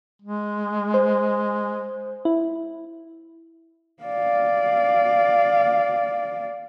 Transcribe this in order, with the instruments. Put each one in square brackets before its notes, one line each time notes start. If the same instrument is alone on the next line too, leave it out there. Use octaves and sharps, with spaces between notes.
[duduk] G#3
[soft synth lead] C5
E4
[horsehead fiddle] D5 F5